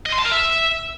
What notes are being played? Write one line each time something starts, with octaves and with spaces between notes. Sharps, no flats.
D#5
C6
A5
A#4
E5